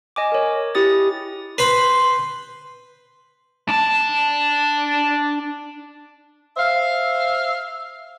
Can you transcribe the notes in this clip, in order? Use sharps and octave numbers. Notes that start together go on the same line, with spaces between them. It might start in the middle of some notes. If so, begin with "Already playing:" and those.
D#5 G#5 D6
A#4 C#5
E4 G4 D#6 A6
B4 C5 B5 C6
D4 A5
C5 E5 F5